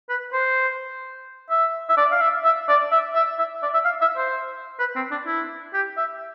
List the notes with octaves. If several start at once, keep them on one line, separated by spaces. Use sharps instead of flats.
B4
C5
E5
E5
D5
F5
E5
E5
D5
E5
E5
E5
D5
E5
F5
E5
C5
B4
C4
D4
E4
G4
E5